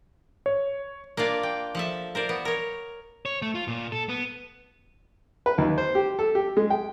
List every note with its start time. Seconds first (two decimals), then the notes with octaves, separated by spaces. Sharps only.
0.46 C#5
1.17 A#3 D4 F4 D5
1.43 G5
1.75 F3 A4 E5
2.15 A#4 C5 D5
2.29 B3
2.45 A#4 C#5
3.25 C#5
3.42 A3
3.55 F4
3.68 A#2
3.92 A4
4.09 B3
5.46 B4
5.58 D#2
5.78 C5
5.95 G4
6.19 A4
6.35 G4
6.57 G#3
6.70 G5